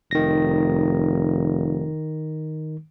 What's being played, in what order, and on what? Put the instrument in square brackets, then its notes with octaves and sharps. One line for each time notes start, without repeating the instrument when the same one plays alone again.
[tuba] F1 [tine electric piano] D#3 A#6